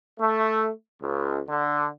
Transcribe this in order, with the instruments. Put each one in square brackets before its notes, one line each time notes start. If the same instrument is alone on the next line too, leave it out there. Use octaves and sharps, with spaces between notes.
[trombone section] A3
C#2
D3